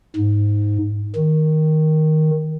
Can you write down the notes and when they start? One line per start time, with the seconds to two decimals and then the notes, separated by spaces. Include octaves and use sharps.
0.16 G#2
1.16 D#3